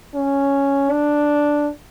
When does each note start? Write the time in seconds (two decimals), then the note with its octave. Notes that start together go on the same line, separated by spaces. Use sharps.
0.15 C#4
0.91 D4